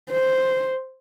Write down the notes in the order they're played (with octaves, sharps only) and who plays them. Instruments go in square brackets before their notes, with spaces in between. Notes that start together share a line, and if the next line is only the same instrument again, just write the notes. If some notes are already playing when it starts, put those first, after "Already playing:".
[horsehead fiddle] C5